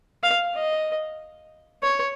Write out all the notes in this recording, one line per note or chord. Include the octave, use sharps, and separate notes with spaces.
F5
D#5
C#5